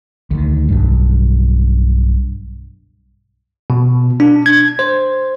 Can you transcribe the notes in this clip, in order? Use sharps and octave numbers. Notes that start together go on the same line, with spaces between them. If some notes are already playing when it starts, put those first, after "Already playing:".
D2 D#3
B1 G2
B2
D4
G#6
C5